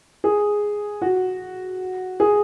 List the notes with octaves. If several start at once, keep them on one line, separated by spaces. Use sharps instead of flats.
G#4
F#4
G#4